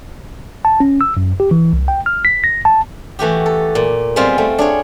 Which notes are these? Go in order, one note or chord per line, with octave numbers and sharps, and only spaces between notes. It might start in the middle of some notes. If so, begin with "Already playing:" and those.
A5
C#4
E6
F#2
G4
E3
C2
G5
F6
B6
A#6
A5
E3 A3 F#4 G4
A4
A#2
G3 G#3 B3 C4 F4
A3 C4
D4 G#4 C#5